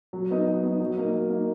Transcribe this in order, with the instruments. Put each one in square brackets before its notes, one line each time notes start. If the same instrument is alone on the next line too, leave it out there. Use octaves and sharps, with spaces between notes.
[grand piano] F#3
B3 D#4
F#3
B3
D#4
F#3
A#3 D#4
F#3
A#3 D#4